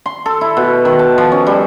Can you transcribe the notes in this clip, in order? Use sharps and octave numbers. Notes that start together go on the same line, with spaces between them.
C6
A4
E4
B2
D#3
A5
F3
C#4
G3